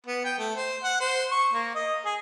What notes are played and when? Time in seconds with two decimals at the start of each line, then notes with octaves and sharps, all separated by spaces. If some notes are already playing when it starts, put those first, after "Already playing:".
0.06 B3
0.25 G5
0.38 A3
0.55 C5
0.83 F#5
1.00 C5
1.31 C#6
1.53 A#3
1.75 D#5
2.05 G#4